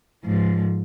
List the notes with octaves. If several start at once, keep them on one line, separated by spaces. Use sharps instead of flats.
G#2 F3